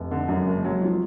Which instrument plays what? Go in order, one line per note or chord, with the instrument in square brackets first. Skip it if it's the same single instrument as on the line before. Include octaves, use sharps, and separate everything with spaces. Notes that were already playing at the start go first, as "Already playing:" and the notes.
Already playing: [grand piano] F1
[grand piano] D3 [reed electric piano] A3
[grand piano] F#2 [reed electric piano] A3
[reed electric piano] G#3
[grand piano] F#1 [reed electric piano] F#3
[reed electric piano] G#3
[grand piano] F#3
F3